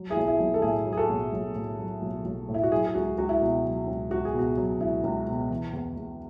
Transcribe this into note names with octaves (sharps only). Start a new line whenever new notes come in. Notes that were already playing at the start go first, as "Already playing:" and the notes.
Already playing: F#3
E4 G#4
B1
E4
B1
A4
A2 E4 G#4
F#3
G#4
F#4 A4
B1
B1
A2
F#3
B1
B1
A2
E4
F#4
F#3 E4 G#4
G#4
C#2 F#4
C#2 F#4
E4
B2 F#4
F#3
C#2
C#2 F#4
G#4
B2 F#4
F#3
C#2 E4
C#2
B2
E3
E2
E2